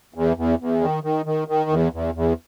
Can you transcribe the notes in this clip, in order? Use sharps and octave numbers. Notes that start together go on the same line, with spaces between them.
E2
E2
E2
D#3
D#3
D#3
D#3
E2
E2
E2